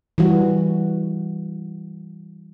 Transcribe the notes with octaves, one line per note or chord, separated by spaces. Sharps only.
E3 G3 F#4